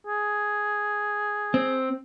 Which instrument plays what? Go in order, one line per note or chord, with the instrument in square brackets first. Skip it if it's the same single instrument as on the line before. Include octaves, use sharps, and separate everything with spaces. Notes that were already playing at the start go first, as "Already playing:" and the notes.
[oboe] G#4
[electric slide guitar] C4